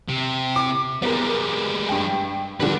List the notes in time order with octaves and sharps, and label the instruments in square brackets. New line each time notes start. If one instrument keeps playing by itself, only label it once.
[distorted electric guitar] C3
[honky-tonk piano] D6
[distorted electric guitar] G3 G#3 [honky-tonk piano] B3 A#4
[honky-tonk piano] G2 G5
[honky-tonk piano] D3 F3 G3 [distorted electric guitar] B4 G5